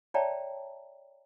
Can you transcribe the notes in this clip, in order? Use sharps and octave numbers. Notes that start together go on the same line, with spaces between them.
C#5 D5 E5 G5 A5 A#5